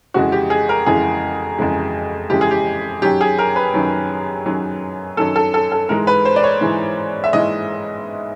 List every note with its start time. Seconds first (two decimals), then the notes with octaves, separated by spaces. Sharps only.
0.14 F2 C#3 E3 G#3 F#4
0.32 G4
0.50 G#4
0.69 A#4
0.86 F2 C#3 E3 G#3 G#4
1.59 F2 C#3 E3 G#3
2.30 F2 C#3 E3 G#3 G4
2.41 G#4
2.51 G4
3.02 F#2 D#3 F#3 G4
3.21 G#4
3.39 A#4
3.56 B4
3.74 F#2 D#3 F#3
4.46 F#2 D#3 F#3
5.17 F#2 D#3 F#3 A4
5.36 A4
5.54 A4
5.72 A4
5.89 G#2 E3 G#3 A#4
6.07 B4
6.25 C5
6.36 D5
6.43 C#5
6.61 G#2 E3 G#3
7.24 E5
7.33 G#2 E3 G#3 D#5